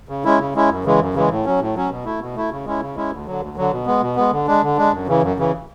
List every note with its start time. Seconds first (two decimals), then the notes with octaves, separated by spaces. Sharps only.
0.09 C#3
0.24 G#3 C#4 E4
0.39 C#3
0.55 G#3 C#4 E4
0.69 F#2
0.84 C#3 E3 G#3
1.00 F#2
1.14 C#3 E3 G#3
1.30 A2
1.45 F#3 C#4
1.60 A2
1.75 F#3 C#4
1.90 B2
2.05 A3 E4
2.20 B2
2.35 A3 E4
2.50 C#3
2.65 G#3 C#4 E4
2.80 C#3
2.96 G#3 C#4 E4
3.11 D2
3.26 D3 F#3
3.41 D2
3.57 D3 F#3
3.71 B2
3.86 G#3 B3
4.01 B2
4.16 G#3 B3
4.31 D3
4.47 G#3 D4
4.62 D3
4.77 G#3 D4
4.92 F#2
5.07 C#3 E3
5.22 F#2
5.37 C#3 E3